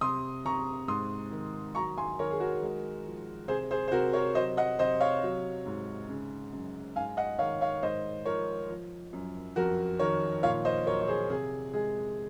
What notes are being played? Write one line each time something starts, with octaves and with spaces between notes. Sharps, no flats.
C3 C6 D#6
C3 A#5 C#6
G#2 C6 D#6
D#3
F#3 A#5 C#6
G#5 C6
D#3 A#4 C#5
G#4
F#4 A#4
G#3
F3
C3 G#4 C5
G#4 C5
C5
C3 F#4 A#4
A#4 C#5
F#3 C5 D#5
D#5 F#5
C3 C5 D#5
C#5 F5
F#3
G#2
C#3
F#2
G#2 F5 G#5
D#5 F#5
D#3 C#5 F5
C#5 F5
G#2 C5 D#5
F3 A#4 C#5
F3
F#2
F2 F#4 A#4
D#3 A#4 C#5
A#2 C#5 F5
C5 D#5
F#3 A#4 C#5
C#5
G#4 C5
C3 G#4
G#3 G#4